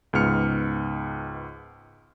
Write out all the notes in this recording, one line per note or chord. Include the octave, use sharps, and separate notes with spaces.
C#2 G#2 B3 F6 C#7